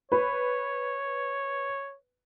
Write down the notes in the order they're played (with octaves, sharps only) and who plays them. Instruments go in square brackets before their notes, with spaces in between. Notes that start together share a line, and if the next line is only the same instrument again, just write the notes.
[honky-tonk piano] B4 [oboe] C#5